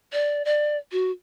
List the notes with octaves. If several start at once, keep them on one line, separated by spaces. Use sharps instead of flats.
D5
D5
F#4